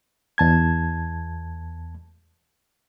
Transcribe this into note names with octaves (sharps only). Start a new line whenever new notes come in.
E2 A5 G#6